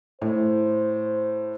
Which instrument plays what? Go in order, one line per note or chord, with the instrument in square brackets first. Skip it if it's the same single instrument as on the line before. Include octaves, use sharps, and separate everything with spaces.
[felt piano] A2 [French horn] C5